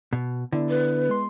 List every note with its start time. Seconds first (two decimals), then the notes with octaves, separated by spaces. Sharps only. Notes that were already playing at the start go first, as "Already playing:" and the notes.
0.13 B2
0.52 D3 B3 E4
0.69 B4
1.09 G#3 C6